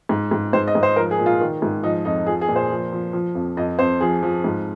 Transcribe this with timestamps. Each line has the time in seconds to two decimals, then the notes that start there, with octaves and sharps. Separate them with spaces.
0.09 G#2
0.31 G#2
0.53 G#2 C5
0.68 D#5
0.75 G#2
0.83 C5
0.96 F3 A#4
1.11 G#4
1.19 A#2
1.26 F4
1.41 D#3
1.62 G#2
1.83 F3 D#4
2.05 F2 D#4
2.26 F3 G#4
2.41 G#4
2.49 A#2
2.56 C5
2.70 F3
2.93 F3
3.13 F3
3.35 F2
3.57 F2 D#5
3.79 F2 C5
4.01 F3 G#4
4.23 F3
4.44 G#2